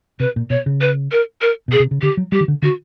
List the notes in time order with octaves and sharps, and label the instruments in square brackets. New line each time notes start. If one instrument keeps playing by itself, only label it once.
[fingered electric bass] C3 [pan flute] B4
[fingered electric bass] A#2
[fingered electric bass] B2 [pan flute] C#5
[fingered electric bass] C#3
[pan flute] B4
A#4
A#4
[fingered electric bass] B2 [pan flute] G#4
[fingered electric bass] C3
C#3
[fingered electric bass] D3 [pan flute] G4
[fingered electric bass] F#3
[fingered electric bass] G3 [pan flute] G4
[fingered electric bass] D#3
D3
[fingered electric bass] D3 [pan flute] F#4